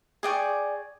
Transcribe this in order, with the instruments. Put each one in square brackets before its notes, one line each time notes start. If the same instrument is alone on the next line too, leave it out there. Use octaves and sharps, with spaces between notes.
[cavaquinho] G#4 D5 G5 C#6